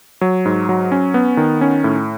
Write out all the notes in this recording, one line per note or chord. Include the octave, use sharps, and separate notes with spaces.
F#3
G#2
F#3
C#4
B3
D#3
C#4
A2